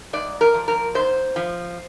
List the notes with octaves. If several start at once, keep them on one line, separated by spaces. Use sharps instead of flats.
G#2 D5
A#4
F3
A#4
G#2 C5
F3